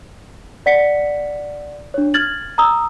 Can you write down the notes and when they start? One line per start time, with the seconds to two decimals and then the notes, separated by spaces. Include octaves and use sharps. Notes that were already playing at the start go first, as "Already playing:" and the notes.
0.66 D5 F#5 B6 C#7
1.94 D4 C#5
2.14 F6 G#6 A6 F#7
2.58 A#5 D#6 E6